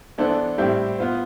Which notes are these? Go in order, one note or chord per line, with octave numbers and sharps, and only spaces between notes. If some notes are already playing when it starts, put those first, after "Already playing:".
E3 B3 D4 A4 C5
A2 G3 C4 E4 G4
B3 F4 C5